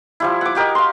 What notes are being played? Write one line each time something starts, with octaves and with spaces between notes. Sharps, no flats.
F3 G3 E4
F#5 D6
F#4 G4 A#4 D#5
F5 C6